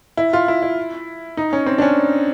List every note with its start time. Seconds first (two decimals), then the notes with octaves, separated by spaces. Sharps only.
0.17 E4
0.33 F4
0.48 E4
0.63 E4
1.37 D#4
1.53 C#4
1.66 C4
1.78 D4
1.82 C#4